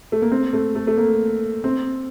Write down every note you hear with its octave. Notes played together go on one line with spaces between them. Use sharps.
A3
A#3
C4
A3
A3
A3
A#3
C4